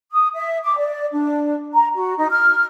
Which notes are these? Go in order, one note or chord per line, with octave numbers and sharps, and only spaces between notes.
D#6
E5
D6
D5
D4
A#5
F#4
D#4
F6